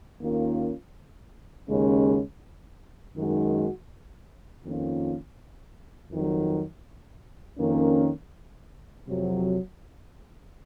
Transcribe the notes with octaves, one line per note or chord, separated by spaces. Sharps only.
D#2 D#3 A#3 C#4 F4
D#2 C#3 G#3 C#4
F#2 D#3 G#3 D#4 F#4
F2 D#3 A#3 C#4 F4
F2 D#3 F#3
F2 D#3 A#3 C#4
F2 C3 F#3